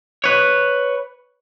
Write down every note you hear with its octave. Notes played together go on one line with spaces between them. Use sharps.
B4 C#5